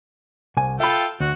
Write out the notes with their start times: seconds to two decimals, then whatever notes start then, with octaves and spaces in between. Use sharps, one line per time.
0.57 C2 G#5
0.80 F4 A4 E5 G5 B5
1.20 D2 F#4